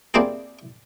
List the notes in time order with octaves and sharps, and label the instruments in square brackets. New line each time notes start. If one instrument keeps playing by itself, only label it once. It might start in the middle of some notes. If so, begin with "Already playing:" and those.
[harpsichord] A#3 C4 D4 E4 G4 G#4